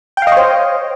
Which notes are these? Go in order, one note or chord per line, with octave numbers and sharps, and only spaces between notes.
C5 C#5 D#5 F5 G5